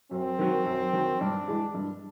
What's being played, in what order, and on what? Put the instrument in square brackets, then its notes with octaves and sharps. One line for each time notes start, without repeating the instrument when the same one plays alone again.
[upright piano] F#2 [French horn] C4
[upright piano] D#3 F#3
F#2
D#3 F#3
[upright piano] G2 [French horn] D4
[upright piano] E3 G#3
G2